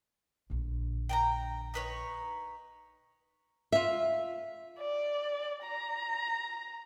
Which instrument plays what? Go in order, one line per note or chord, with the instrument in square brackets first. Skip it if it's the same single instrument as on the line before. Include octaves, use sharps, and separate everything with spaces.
[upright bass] A#1 D3
[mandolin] G5 A5 A#5
D#4 B4 C#5
[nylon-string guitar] F4 E5
[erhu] D5
A#5